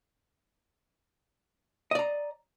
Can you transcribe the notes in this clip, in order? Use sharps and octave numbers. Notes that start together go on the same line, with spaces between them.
D5 D#5 A#5